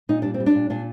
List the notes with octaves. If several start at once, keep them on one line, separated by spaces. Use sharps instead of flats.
A#2 D#4
G3 D4
C4
G3
D4
A#2
A#2 D4